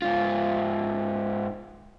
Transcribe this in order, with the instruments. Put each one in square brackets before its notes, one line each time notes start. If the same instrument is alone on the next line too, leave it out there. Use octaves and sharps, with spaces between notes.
[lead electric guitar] G#2 F4